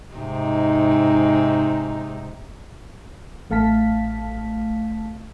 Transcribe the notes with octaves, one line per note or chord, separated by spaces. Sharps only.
G#2 C3 D#4
A1 A3 F5 A5 B6